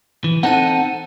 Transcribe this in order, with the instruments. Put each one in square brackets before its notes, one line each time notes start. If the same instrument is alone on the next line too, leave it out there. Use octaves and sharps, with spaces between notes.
[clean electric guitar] E3
[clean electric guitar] C4 D#4 A4 [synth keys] F#5 D#7